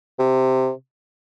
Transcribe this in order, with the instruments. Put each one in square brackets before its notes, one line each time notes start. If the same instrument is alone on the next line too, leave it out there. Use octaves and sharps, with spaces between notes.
[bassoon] C3